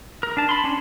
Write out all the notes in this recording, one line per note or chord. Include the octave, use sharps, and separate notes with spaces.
A#4
D4 A5
B5 C6
C#4 D4